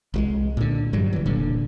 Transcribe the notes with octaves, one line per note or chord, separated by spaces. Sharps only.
C2 F3 G#3
A#2 D3
G2 F#3 G3
C#3 E3
E1 A#2 D3